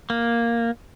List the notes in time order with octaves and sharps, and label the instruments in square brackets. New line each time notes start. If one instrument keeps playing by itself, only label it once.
[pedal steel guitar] A#3